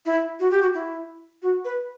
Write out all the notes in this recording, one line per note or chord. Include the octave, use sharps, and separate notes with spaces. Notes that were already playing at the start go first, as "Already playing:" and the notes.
E4
F#4
G4
F#4
E4
F#4
B4